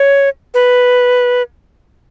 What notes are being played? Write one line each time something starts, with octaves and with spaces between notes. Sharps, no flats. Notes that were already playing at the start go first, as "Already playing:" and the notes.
Already playing: C#5
B4